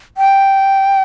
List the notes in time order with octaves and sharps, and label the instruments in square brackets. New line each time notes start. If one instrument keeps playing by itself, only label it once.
[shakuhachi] G5